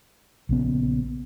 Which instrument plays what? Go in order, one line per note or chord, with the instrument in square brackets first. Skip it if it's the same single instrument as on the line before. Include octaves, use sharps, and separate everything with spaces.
[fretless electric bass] A#1 C#3 B3